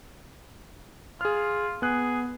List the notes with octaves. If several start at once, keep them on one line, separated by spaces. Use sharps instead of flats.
F4 G#4 F6
B3 G#4 F#6